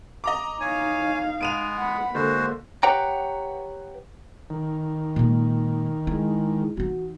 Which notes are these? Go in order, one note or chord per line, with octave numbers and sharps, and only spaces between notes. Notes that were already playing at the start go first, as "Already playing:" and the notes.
D#5 A#5 D6
D#4 C#5 F5 G#5
G#3 B3 D7 D#7 F7
F#5 B5
D3 G#3 A#3 F#4 C5
G4 B4 C#5 F#5 G5 A#5
D#3
A#2 G#3
G#3 E4
E3 D#4 F#4